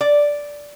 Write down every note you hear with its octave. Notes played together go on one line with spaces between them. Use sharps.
D5